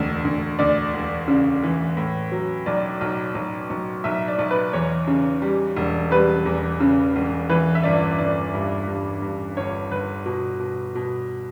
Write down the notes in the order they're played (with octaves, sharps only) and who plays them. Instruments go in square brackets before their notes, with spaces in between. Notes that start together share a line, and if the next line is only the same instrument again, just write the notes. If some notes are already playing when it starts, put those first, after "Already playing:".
Already playing: [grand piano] E1 D2
D2
D2 D5
E1
C#3
E3
A2
F#3
B1 D5
B1
B1
B1
B1 E5
D5
B1
B4
E2 C#5
C#3
G3
E1
G3 B4
E2
C#3
E1
E3 B4
E5
G1 D5
G1 D5
G2
G2
G2
G1 C#5
G1 B4
B2
B2
B2